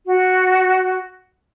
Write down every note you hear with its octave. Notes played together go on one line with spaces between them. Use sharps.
F#4